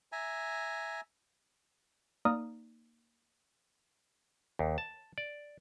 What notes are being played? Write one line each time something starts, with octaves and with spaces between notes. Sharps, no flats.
E5 G#5 A#5
A#3 D#4 D5 A#5 D#6 F6
D#2
A5
D5